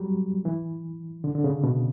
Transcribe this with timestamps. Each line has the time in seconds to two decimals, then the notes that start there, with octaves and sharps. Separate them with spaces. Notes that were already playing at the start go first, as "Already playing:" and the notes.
Already playing: F#3 G3
0.45 E3
1.24 D3
1.35 D3
1.44 C#3
1.64 B2